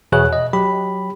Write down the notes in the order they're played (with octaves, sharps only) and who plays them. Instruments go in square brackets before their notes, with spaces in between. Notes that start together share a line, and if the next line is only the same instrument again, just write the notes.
[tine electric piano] E2 B2 G#4 C#5 F#6
D#5
F#3 G4 B5